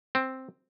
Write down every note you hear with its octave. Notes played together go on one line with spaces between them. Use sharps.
C4